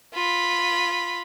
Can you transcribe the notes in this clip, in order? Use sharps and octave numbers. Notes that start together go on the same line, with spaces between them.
F4 B5